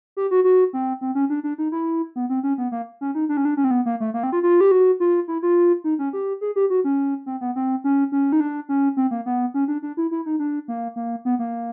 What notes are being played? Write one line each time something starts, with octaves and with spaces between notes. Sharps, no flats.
G4
F#4
F#4
C4
C4
C#4
D4
D4
D#4
E4
B3
C4
C#4
B3
A#3
C#4
D#4
D4
C#4
D4
C#4
C4
B3
A#3
A3
A#3
C4
F4
F4
G4
F#4
F4
E4
F4
D#4
C#4
G4
G#4
G4
F#4
C#4
C4
B3
C4
C#4
C#4
D#4
D4
C#4
C4
A#3
B3
C#4
D4
D4
E4
E4
D#4
D4
A#3
A#3
B3
A#3